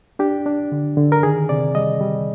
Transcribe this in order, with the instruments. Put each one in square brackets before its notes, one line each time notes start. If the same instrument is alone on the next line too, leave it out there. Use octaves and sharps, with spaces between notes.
[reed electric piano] D4 G4
D4
D3
D3
A#4
D#3 G#4
C3 D5
G3 D#5
G3